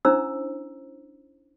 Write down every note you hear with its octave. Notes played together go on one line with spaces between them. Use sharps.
C#4 D4 E4 C5 A#5 E6